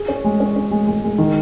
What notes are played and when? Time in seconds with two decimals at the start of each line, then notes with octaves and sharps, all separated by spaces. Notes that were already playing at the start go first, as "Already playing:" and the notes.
Already playing: G#4
0.08 C#4
0.24 G#3
0.40 C#4
0.56 C#4
0.71 G#3
0.87 G#3
1.04 G#3
1.18 D#3